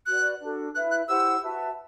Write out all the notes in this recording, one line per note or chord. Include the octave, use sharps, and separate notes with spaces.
F#4 B4 D5 F#6
D4 F#4 A4
E4 B4 E5 F#6
F#6
E4 G4 C5 F#5 E6
F#4 B4 E5 A5